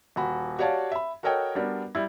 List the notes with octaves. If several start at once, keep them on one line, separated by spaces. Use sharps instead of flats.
D#1 F#4 B5
F#4 G4 C#5 D5 F5 A5
E5 B5
F#4 A4 A#4 C#5 D#5 G5
G3 B3 D4 F#4 A#4
G3 E4